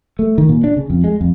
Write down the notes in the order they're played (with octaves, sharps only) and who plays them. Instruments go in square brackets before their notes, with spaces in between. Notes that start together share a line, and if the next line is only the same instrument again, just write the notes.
[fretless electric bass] A3
D#3
A#2
D4
C#3
F2
G#3
F2